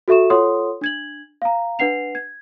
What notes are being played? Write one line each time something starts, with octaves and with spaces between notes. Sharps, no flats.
F#4 A4 E5 C#6 E7
F4 A4 C#5 F#5 C6 D#6
D4 G#6 F#7
F5 A#5
D4 B4 F#5 C7 F7
G#6